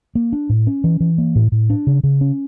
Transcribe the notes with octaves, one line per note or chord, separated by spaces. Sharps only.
A#3
D4
A2
C#4
E3
E3
A#3
A2
A2
D4
C#3
C#3
C#4